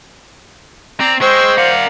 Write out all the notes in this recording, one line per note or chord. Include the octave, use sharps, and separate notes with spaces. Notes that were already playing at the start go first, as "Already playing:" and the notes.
C4 D5 A#5
G#3 C5 G5 C#6 E6
A#4 D5 F5 F#5